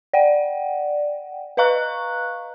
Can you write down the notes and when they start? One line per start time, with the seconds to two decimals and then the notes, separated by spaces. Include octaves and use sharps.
0.13 D5 F#5 G5
1.57 B4 D#5 F5 A#5 C#6 F#6